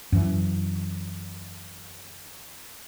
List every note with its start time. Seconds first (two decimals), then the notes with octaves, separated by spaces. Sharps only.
0.12 F#2 E3